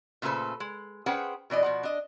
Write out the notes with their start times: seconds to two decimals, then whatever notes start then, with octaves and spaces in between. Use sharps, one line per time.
0.22 A#2 C#3 A3 A4 B4 C5
0.60 G#3
1.06 C#4 G#4 B4 C5 F#5 G5
1.50 B2 E3 D5 D#5
1.63 B2 F3 F#5
1.83 D4 D#5